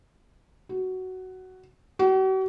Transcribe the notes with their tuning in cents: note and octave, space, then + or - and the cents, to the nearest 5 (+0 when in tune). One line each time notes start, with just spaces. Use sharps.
F#4 +10
F#4 +45